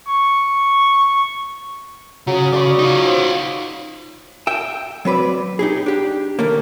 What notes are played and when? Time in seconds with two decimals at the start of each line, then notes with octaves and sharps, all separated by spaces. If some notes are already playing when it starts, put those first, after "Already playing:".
0.08 C#6
2.27 C#3 F#3
2.52 C#3 D5 B5 C#6
2.79 D#4 F4
3.04 C5 C#5
4.47 E5 G5
5.05 F#3 C4 B4 D5
5.59 D#4 G4 G#4
5.86 D4 G4
6.39 D#3 A3 A#3